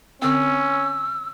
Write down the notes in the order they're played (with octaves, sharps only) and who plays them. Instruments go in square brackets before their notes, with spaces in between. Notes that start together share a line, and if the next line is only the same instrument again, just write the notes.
[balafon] D3 C4 [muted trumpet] C#4 [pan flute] E6